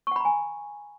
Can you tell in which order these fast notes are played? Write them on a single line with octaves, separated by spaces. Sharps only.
C#6 F#5 B5 A#5 G#5